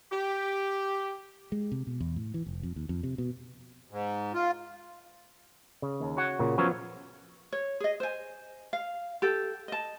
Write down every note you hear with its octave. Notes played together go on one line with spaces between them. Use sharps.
G4
G#3
C3
B2
E2
A2
E3
F1
F2
D#2
F2
C3
B2
G#2
F4
C#3
D#2
F#4 C#5 F#5
A#2 C#3
F3 F#3 B3 C#4
C#5
G#4 D#5
C5 G#5
F5
G4 A4
D#5 A5